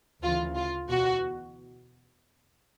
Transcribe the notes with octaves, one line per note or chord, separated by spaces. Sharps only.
D2 C#3 E3 F4
F4
E2 B2 F#4